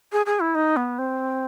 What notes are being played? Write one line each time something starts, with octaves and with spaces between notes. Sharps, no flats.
G#4
G#4
E4
D#4
B3
C4